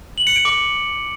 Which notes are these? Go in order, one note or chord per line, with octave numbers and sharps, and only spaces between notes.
F#7
C#7
D7
D6